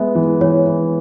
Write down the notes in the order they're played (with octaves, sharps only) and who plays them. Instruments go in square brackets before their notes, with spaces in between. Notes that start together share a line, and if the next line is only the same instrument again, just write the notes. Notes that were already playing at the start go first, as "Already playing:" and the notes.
Already playing: [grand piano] G#3 B3 [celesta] E5
[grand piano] E3
[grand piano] E3 [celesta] C#5
[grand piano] E3